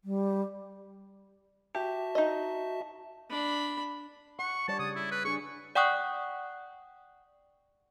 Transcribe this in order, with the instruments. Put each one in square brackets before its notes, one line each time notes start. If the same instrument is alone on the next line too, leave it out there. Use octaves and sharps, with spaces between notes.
[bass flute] G3
[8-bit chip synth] F#4 E5 A5 [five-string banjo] G4
[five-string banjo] D#4 D#5
[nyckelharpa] D4 B5
[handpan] F#5 [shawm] C#6
[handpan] G3 C#5 D5 [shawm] A5
[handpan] C#3 [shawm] D#6
[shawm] E4
B4
[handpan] D4 G#4 [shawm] C#6
[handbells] D5 F#5 G5 C#6 D#6 F#6